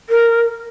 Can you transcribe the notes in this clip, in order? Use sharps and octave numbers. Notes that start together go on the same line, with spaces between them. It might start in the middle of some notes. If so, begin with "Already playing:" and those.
A#4